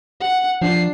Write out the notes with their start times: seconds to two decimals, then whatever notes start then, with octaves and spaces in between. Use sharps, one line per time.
0.20 F#5
0.62 F3 D4 C7